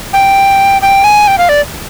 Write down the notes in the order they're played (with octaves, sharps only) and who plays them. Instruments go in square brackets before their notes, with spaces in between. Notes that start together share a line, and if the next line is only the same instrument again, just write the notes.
[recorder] G5
G5
G#5
G5
F5
D5